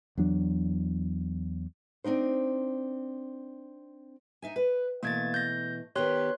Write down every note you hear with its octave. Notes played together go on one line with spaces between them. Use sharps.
E2 F#3 D4
C4 D4 D#4 C5
D#4 E5 G#5
B4
B2 E3 A3 A#3 G#6 A6
G6 A#6
D#3 B3 G4 C#5 C6 F#6